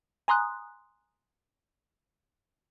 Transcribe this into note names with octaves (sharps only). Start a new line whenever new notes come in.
G#5 A#5 C6 D#6 F#6